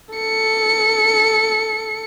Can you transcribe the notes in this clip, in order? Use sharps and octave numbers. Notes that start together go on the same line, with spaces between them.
A4 C#7